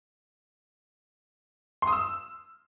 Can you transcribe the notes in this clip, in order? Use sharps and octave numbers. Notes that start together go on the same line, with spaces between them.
C6
D#6
E6